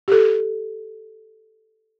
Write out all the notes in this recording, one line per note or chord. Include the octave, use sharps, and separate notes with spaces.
G4 A4